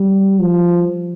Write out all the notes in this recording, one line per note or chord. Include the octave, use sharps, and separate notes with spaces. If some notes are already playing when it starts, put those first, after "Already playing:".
Already playing: G3
F3